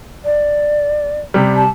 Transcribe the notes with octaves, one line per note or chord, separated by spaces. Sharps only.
D5
C3 G3
A5